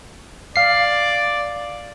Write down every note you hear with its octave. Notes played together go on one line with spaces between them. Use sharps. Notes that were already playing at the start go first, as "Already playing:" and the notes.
D5 F5 C7